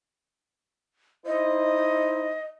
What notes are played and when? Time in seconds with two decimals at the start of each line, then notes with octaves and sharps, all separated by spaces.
1.26 D#4 E4 C5 D#5